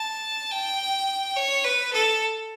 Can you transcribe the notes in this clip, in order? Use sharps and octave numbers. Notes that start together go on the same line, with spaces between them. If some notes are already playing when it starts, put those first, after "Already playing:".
Already playing: A5
G5
C#5
B4
A4